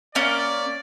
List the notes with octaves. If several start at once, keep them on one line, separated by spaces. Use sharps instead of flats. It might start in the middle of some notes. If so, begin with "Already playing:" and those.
A#3 C#4 D5